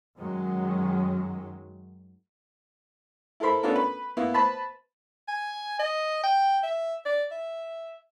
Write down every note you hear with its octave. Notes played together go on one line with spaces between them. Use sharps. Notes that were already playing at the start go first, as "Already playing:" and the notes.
F#2 D#3 F#3 G#3
E4 A4 A#4 C5 B5
B3 C#4 D4 F4 A4 A#4
B4
A#3 B3 E4
B4 C5 A5 B5
G#5
D#5
G5
E5
D5
E5